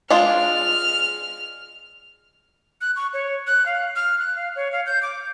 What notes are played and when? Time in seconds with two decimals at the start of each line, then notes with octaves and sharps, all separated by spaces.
0.10 G#3 D4 F4 F6
2.81 F#6
2.96 C#6
3.14 C#5
3.47 F#6
3.66 F5
3.96 F6
4.19 F#6
4.36 F5
4.56 C#5
4.72 F5
4.86 G6
5.03 D6